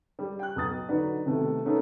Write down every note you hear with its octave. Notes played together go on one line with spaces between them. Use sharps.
G3
G5 F#6
B1 B3 D#6 A6
D3 F#3 D#4 F#4 B4 D5
C3 D#3 A3 B3
A3 B3 C#4 D#4 A#4